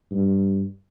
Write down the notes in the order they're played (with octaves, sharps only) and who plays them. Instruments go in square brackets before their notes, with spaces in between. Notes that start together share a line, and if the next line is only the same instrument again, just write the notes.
[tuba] G2